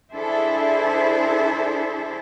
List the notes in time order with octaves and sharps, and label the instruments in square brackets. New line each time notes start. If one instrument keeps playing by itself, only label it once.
[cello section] D4 E4 G#4 A4 C5 E5